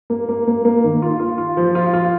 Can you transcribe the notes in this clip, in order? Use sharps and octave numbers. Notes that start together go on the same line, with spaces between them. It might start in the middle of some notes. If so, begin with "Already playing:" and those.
A#3
A#3
A#3
A#3
D#3
F4
F4
F4
F3
F4
F4